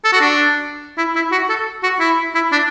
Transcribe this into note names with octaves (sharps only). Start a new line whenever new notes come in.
A4
F#4
D4
E4
E4
F#4
A4
F#4
E4
E4
D4